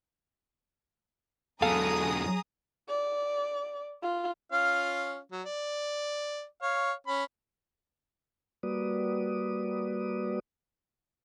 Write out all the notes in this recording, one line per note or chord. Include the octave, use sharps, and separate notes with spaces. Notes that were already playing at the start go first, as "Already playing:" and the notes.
E2 F#3 G#4 A4 F5 A#5 D#6
D5
F4
C#4 F4 F5
F#3
D5
C#5 F5
C#4 B5
G3 A#3 F#4 B4 D5 D#6